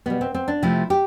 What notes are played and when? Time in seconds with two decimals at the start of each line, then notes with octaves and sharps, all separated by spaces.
0.06 B2 G3 B3
0.21 C4
0.34 C4
0.48 D4
0.62 C3 F3 A3 E4
0.90 G4